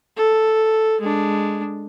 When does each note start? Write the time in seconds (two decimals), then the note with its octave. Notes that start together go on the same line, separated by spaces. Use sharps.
0.17 A4
1.00 G#3 D4